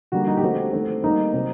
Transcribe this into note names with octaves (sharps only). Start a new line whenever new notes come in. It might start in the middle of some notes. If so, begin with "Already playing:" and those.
D3 G3 A#3 F#4
D#4
G4
D3 A3 C4 F#4
D#3 A3 C4
D#3 G3 A#3 D#4
C3 F#3 C4